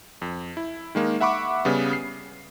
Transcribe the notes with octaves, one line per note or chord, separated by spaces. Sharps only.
F2
E4
D#3 G#3 A#3
E5 F#5 B5 C#6 D6
C#3 G3 B3
C7